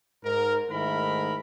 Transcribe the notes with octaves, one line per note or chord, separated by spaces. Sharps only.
G#2 A#4
G#2 D#3 A3 E4 A#4 B5